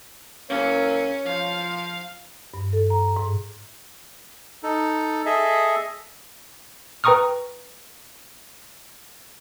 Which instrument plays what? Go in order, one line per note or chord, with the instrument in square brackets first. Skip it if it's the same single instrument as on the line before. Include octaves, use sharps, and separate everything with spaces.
[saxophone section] E2 F#3 A#3 [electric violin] C#4 [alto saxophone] C#5
[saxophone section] F3 [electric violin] F5
[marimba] G2
A4
A#5
G#2
[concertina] D#4 A4
G#4 A4 D#5 E5
[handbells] B4 G5 A#5 C#6 D#6 F6